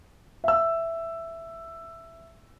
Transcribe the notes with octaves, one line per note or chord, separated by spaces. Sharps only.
E5 E6